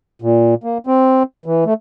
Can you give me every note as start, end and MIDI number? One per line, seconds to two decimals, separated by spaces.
0.22 0.55 46
0.64 0.78 58
0.87 1.23 60
1.46 1.64 52
1.66 1.74 57